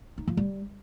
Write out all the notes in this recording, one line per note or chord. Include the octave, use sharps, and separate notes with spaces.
D#4
F3
G3